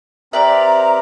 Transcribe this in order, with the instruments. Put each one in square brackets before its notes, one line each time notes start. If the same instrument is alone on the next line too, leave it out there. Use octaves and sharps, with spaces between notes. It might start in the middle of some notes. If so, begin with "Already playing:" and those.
[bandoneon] C4 G4 A#4 [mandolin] B4 D5 [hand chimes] E5 [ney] A#5